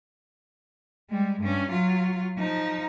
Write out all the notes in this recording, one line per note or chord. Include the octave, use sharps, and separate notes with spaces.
G3 G#3
G2 C#4
F#3 F4
F3 D#4